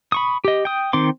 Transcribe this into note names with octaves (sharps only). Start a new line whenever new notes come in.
B5 C#6 D#6
G4 D#5
G5 D#6
D#3 C4 C6 D6